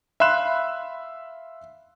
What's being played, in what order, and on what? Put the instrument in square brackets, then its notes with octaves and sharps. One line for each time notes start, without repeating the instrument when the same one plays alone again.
[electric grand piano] E5 F5 B5 C6 F#6 E7